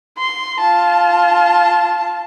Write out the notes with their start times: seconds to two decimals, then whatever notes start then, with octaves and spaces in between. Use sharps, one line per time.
0.18 C6
0.60 F4 A5